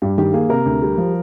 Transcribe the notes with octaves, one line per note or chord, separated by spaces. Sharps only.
G2 G4
D#3 G4
A#3 G#4
C3 A#4
D2
G3
F3